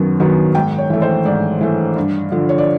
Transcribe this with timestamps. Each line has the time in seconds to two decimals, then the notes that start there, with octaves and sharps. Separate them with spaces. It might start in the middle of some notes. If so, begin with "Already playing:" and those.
Already playing: F#2 D#3 F#3 B3
0.20 D#3 F#3 B3
0.55 G#2 G5
0.78 C#5
0.90 E3 A3
1.02 C5
1.25 G#2 D5
1.61 E3 A3
1.96 G2
2.32 D3 F3
2.49 C#5
2.58 D5